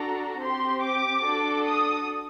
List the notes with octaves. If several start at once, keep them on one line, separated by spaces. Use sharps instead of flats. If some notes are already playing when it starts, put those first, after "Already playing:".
Already playing: D4 F#4 A4 A#5
C4 G4 C6
D6
D4 F#4 A4
D#6